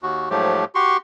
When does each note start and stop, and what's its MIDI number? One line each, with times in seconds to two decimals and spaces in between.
0.03 0.29 39
0.03 0.29 66
0.30 0.64 44
0.30 0.64 53
0.30 0.64 54
0.30 0.64 57
0.30 0.64 67
0.75 0.97 66
0.75 0.97 67
0.75 0.97 84
0.75 0.97 85